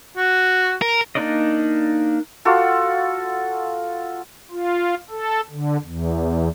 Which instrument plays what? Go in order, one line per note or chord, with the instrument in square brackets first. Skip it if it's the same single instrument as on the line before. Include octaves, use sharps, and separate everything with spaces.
[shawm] F#4
[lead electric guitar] A#4
[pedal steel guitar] A#3 D4 D#4 D5 D#5
[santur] F4 F#4 A4
[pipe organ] F4
A4
D3
E2